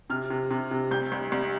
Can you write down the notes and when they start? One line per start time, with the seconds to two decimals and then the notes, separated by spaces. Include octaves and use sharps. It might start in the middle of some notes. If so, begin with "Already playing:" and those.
0.10 C3 F6
0.30 C3
0.50 C3
0.71 C3
0.91 C2 G6
1.12 C2
1.32 C2